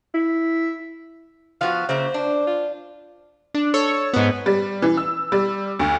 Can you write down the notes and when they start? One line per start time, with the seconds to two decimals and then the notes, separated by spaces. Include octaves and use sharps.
0.14 E4
1.61 F3 B3 F#4 F5
1.89 C#3 A#3 C5 E5
2.14 D4
2.47 F4
3.54 D4
3.74 A4 C#5
4.13 G#2 B3
4.46 G3
4.82 E3
4.97 E6
5.32 G3
5.79 D2